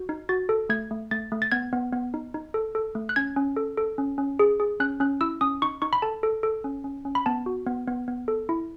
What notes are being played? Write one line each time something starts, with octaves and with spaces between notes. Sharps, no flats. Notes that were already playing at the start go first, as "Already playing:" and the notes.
Already playing: F#4
D#4
F#4 A6
A4
A3 G#6
A3
A3 A6
A3
A6
B3 G#6
B3
B3
D#4
D#4
A4
A4
A3
F#6
C#4 G#6
C#4
A4
A4
C#4
C#4
G#4
G#4
C#4 F#6
C#4 F#6
E4 E6
C#4 D#6
D#4 C#6
D#4 C#6
B5
A4 A5
A4
A4
C#4
C#4
C#4
B5
B3 A5
F#4
B3
B3
B3
A4
E4